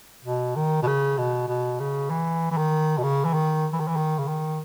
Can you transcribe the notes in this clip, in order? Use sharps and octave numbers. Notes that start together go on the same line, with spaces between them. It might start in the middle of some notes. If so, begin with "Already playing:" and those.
B2
D#3
B2
C#3
B2
B2
C#3
E3
E3
D#3
B2
C#3
E3
D#3
E3
D#3
E3
D#3
C#3
D#3